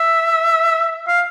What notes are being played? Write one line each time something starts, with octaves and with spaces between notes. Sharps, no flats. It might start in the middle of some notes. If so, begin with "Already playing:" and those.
Already playing: E5
F5